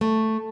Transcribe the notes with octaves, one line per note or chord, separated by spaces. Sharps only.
A3